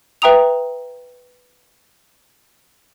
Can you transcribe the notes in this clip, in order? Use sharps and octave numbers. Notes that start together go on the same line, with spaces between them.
B4 E5 G5 A#5 D#6 F7